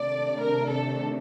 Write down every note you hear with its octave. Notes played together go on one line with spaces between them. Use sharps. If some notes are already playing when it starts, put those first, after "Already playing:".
Already playing: C3 D#3 A3 D4 D5
A#4
A4